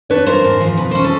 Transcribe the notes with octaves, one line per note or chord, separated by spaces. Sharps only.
D4 B4 C#5
A#3 A#4 C5
G#2
F3
B2 B4
C#4 C5
A4